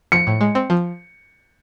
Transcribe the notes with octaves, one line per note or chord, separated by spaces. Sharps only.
F3 C#7
A2
G#3
C4
F3